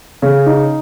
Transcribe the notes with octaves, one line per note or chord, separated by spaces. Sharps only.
C#3
D#4